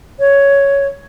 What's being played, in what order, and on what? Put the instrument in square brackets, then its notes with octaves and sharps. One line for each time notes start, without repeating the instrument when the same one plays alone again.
[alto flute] C#5